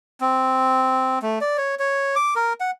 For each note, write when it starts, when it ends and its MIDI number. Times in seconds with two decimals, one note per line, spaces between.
0.21 1.19 60
1.22 1.39 57
1.41 1.57 74
1.58 1.75 73
1.79 2.15 73
2.16 2.34 86
2.36 2.53 70
2.60 2.71 78